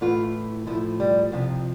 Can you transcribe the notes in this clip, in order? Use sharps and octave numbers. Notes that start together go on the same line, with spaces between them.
A2 E3 F4
A2 F3 E4
G3
F2 C3 F3